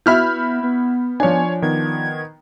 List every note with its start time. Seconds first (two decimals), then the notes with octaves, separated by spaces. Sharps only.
0.06 B3 E4 F#4 E5 B5 F6 G6
0.63 B3
1.20 F3 D4 C#5 G#5
1.62 D#3 B3 G#6